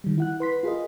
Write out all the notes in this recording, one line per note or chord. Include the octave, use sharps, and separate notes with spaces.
D#3 G3
E4 F#5 F#6
B4 C6 B6
F4 G#4 A#4 D#5